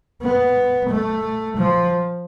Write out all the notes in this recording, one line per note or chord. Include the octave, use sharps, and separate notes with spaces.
B3
A3
F3